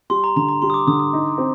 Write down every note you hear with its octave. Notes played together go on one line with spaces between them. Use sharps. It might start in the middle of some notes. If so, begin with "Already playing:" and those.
G3 C6
A#5
D3 A#5
A#5
G3 C6
D#6
D6
D3 D#6
D#6
D#4
C4